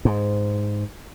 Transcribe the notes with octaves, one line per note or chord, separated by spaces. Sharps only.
G#2